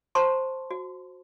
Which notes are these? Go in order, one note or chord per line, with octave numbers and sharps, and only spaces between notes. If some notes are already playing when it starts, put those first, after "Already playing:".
C5 A5 A#5 C6 C#6
F#4